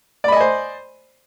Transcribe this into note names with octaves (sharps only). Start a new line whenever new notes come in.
C5 D5 D#5 G#5 B5